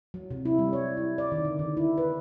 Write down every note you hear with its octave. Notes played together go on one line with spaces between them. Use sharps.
F#3
C3
E4
G3
C#5
E4
D5
D#3
D3
D#3
E4
B4